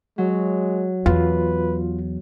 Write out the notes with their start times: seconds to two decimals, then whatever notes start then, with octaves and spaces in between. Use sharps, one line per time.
0.18 F#3 G#3
1.06 E2 F4 B4